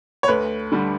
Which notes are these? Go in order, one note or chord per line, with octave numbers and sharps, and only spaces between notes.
C#5
D2 B4
D3 G3